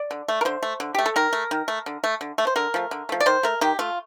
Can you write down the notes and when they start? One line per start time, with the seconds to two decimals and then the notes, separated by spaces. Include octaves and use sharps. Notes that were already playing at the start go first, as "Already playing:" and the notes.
Already playing: D5
0.11 D3
0.28 A3
0.41 A#4
0.45 D3 C5
0.63 A3
0.80 D3
0.95 A3 G4
1.06 A4
1.16 D#3 A#4
1.33 A3
1.51 D#3
1.68 A3
1.86 D3
2.04 A3
2.21 D3
2.38 A3
2.47 C5
2.56 D3 A#4
2.74 F3 A3
2.91 D3
3.09 F3 A3
3.20 D5
3.26 D#3 C5
3.43 A3 A#4
3.61 D#3 G4
3.79 A3 F4